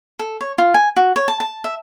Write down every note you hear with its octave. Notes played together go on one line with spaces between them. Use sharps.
A4
C#5
F4
G#5
F#4
C#5
A5
A5
E5